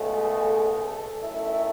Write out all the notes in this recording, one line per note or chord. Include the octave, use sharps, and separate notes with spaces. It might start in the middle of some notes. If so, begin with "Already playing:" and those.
Already playing: C#2 B2 A3
G#4
G#4
A4
F#2 D#3 A3 E4